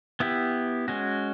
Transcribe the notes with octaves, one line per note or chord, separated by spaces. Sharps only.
B3 E4 G4
G#3 C#4 F#4